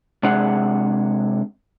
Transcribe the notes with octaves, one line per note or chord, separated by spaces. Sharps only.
C3 G#3 D4 G#4 F#5